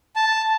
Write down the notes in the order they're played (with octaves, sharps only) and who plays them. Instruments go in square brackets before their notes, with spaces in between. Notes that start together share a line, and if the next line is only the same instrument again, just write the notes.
[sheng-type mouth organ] A5